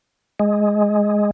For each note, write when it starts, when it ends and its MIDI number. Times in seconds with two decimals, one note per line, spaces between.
0.40 1.31 56